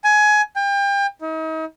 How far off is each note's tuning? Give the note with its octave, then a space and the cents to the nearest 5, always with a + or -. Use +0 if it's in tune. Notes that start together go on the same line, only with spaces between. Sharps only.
G#5 +20
G5 +35
D#4 +40